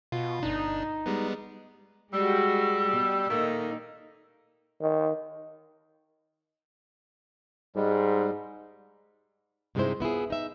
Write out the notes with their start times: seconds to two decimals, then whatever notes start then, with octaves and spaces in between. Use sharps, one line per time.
0.12 B2 F4
0.43 G1 D4 D#4
1.06 G3 G#3 B3
2.13 G3 G#3 F#4 E6
2.93 B2
3.29 A#2 D#3 A3 A#3 D#4
4.81 D#3
7.76 G#2 G3 G#3
9.75 G2 C3 G#3 D#4 E4 C5
10.00 B3 E4 F4 G#4
10.30 D#4 E5